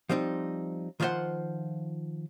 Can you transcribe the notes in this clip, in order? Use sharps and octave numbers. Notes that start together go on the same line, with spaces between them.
F3 G3 C4 D#4
D#3 F3 F4 F#4 C5 F#5